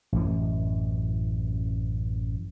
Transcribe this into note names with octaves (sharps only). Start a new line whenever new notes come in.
A1 F#2 E3